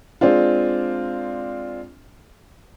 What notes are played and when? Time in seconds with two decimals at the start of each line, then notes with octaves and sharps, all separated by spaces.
0.21 G#3 C4 D4 F4